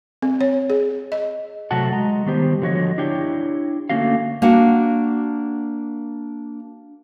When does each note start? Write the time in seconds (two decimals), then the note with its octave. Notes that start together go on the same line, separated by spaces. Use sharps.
0.22 C4
0.41 C#5
0.70 G#4
1.12 D#5
1.71 C3 F#3 A3 F#4 F#5 A5
1.92 G#3 D#5 A#5
2.26 D#3 G3 B3 G4 C5
2.62 D3 F3 F#4 C#5 D#5
2.98 D4 E4 G4 C#5 G5
3.89 D3 A3 A#3 C#4 F#4 F5
4.42 A#3 D4 F#4 F#5